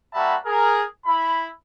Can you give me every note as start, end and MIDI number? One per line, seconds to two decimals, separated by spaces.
0.13 0.35 55
0.13 0.35 58
0.13 0.35 66
0.13 0.35 76
0.13 0.35 81
0.13 0.35 83
0.45 0.82 68
0.45 0.82 70
1.06 1.47 64
1.06 1.47 83